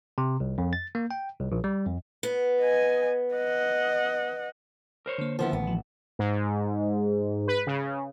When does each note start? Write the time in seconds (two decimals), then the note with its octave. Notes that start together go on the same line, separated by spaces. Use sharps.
0.18 C3
0.40 C2
0.58 F2
0.73 A6
0.95 A#3
1.11 G5
1.40 C2
1.52 A#1
1.64 G3
1.87 F2
2.23 B3
2.61 D#5 G#5
3.35 D#5 F#5
5.06 A#4 C5 C#5
5.18 D3 A#3
5.39 D#2 F3 B3 E4
5.53 A1 B3
5.67 F3
6.19 G#2
7.48 B4
7.67 C#3